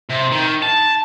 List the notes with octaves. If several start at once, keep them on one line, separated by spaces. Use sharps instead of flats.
C3
D#3
A5